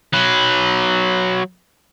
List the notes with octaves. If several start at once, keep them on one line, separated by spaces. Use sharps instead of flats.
F#3 B4